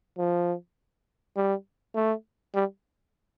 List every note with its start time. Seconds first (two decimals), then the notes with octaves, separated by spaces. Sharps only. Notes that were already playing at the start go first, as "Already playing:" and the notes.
0.18 F3
1.36 G3
1.95 A3
2.55 G3